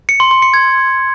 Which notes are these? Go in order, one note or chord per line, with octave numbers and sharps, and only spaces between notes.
C#7
C6
C6
C#7
G#6